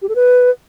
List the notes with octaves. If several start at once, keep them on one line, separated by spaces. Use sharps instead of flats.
G4
A4
B4